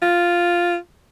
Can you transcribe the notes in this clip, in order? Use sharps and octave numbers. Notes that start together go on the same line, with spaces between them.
F4